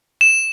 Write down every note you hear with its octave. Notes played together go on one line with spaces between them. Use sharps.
E7